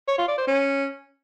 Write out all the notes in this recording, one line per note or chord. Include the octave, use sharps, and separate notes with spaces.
C#5
F4
D5
C5
C#4